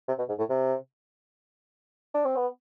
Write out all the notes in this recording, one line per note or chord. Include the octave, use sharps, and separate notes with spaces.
C3
B2
G#2
A2
C3
D4
C4
B3